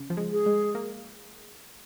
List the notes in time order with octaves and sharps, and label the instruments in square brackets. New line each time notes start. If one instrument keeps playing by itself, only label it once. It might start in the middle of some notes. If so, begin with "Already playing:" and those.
Already playing: [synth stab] C#3
F3
G#3
[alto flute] G#4
[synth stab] G#3
A#3